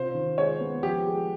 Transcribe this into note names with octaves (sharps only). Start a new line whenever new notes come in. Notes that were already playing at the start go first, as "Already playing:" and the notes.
Already playing: C3 F4 C5
D#3
G#3 C#5
B3
F3 G4
G#3